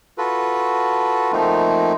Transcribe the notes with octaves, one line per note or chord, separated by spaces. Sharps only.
F4 F#4 A4 B4
F3 A3 A#3 C4 D#4